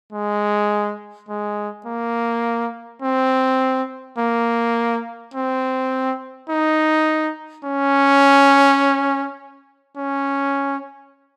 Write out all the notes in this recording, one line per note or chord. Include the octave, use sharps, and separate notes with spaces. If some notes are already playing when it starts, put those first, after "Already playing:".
G#3
G#3
A#3
C4
A#3
C4
D#4
C#4
C#4